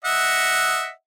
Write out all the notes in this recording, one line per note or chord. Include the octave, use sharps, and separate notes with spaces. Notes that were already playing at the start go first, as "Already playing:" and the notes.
D#5 E5 F#5